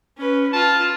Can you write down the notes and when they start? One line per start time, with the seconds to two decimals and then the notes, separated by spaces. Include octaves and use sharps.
0.18 C#4 B4
0.53 F4 A5